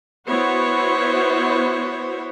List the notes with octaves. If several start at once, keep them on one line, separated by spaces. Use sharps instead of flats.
B3 E4 F#4 C5 C#5